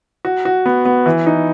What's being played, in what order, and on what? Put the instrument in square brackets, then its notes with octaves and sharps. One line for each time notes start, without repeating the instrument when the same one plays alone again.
[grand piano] F#4
F#4
B3
B3
E3
D#4